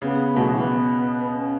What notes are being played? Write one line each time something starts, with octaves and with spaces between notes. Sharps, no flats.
C#3 B3
B2 A3
F#3
E3
B3
B3
C#4